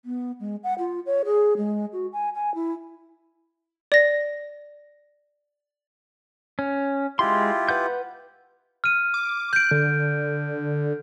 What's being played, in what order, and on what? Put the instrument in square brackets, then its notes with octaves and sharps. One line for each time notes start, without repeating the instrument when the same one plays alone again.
[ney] B3
G#3
F#5
F4
C#5
G#4
G#3
F#4
G#5
G#5
E4
[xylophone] D5 A#6
[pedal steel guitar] C#4
[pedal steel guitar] G#3 C6 [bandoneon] E4 F4 G4
[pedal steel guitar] B4 F#5 G6
[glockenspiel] F6 D#7
[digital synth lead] D6
[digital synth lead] F#6 [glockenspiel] G6 D7
[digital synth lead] D3